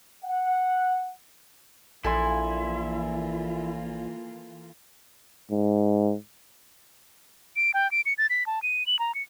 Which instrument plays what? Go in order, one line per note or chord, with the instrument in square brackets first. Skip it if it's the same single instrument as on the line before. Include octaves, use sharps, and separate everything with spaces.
[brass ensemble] F#5
[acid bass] A#1 [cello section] E3 A#3 F4 [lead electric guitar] E4 [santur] A4 G#5 C6
[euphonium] G#2
[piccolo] D7
G5
D7
C#7
A6
B6
A5
D#7
F#7
A#5
C#7